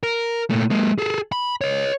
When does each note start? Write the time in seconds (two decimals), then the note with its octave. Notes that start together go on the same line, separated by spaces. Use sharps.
0.03 A#4
0.50 A#2 A3
0.70 G#3 A#3
0.98 G#4 A4
1.32 B5
1.61 C#5 D#5